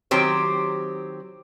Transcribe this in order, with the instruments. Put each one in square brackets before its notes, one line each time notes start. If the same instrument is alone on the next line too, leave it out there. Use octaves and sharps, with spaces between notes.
[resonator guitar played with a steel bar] D#3 F#3 C4 G4 C5